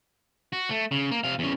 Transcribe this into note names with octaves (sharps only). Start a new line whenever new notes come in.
F#4
A3
C#3
A#3
C3 F5
E2 C#4